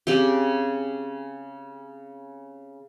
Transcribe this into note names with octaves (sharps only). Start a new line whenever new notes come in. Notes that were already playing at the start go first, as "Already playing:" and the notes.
C#3 C4 G4